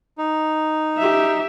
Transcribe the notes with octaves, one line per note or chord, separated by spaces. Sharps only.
D#4
G4 E5